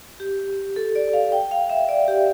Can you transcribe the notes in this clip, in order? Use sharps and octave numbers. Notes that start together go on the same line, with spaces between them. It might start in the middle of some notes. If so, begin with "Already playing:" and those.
G4
A4
D5
F5
G5
F5
E5
D5
G4